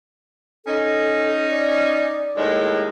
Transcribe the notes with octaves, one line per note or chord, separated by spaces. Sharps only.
C#4 D#4 A4
D5
D#2 A2 G#3